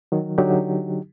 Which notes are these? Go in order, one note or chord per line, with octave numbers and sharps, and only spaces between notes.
D#3 F#3
D3 F#3 D#4 G4